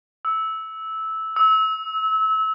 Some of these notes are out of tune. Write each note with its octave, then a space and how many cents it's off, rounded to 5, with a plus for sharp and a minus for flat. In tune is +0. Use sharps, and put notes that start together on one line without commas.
E6 -15
E6 -30